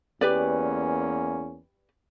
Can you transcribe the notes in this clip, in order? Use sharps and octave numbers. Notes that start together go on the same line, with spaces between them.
E2 A#3 C#4 G4 B4 D5